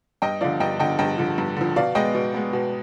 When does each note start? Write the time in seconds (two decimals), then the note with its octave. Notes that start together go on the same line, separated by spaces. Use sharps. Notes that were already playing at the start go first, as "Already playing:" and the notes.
0.22 G2 D#5 G5
0.41 D3 F3 D5 F5
0.60 G2 D#5 G5
0.79 D3 F3 D#5 G5
0.99 G2 D#5 G5
1.18 D3 F3
1.38 G2
1.57 D3 F3
1.76 B2 D5 F5
1.95 G#3 B3 D#5 G5
2.15 B2
2.34 G#3 B3
2.53 B2